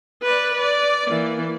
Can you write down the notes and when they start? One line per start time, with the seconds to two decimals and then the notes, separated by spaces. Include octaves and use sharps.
0.23 B4 D5
0.58 D5
1.07 E3 A#3